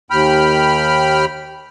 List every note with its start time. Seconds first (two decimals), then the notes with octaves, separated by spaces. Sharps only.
0.11 D#2 G5 B5 F6